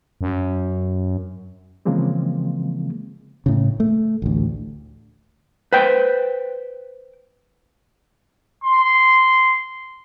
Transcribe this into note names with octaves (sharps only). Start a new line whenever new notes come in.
F#2
C#3 E3 F3 G#3 A#3 C4
A2 C#3
A3
A1 D2
B4 C5 G5
C6